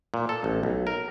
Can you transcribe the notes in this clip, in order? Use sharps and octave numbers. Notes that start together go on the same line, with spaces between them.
A#2
A4
A1
B1
A#4